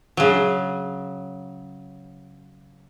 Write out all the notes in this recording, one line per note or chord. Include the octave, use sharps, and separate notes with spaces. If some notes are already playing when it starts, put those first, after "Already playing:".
C#3 F#3